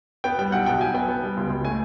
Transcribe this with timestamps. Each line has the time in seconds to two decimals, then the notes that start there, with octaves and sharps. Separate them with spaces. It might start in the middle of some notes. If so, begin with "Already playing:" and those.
0.24 B3 G5
0.38 G3 G5
0.52 B1 F#5
0.66 B2 G5
0.80 B1 G#5
0.94 B3 G5
1.08 B3
1.23 G3
1.37 C#2
1.50 C#2
1.65 A3 G#5